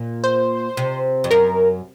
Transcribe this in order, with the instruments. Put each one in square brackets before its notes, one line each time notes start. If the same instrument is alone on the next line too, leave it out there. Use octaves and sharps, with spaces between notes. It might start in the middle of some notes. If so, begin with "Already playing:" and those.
Already playing: [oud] A#2
[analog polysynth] C5
[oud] C3
F2
[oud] F#2 [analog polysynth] A#4